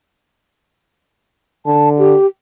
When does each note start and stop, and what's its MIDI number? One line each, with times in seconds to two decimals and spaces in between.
1.66 2.15 50
1.66 1.89 81
1.99 2.27 67